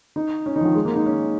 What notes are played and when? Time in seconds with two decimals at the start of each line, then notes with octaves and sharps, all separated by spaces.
0.16 D#4
0.46 C#4
0.56 F3 D#4
0.66 D#3
0.75 G#3
0.85 A#3
0.96 D#4
1.06 C#4